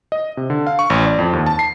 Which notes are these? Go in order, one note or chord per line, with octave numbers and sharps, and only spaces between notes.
D#5
C3
D3
F5
C#6
A1
D5
F2
D#2
A5
C7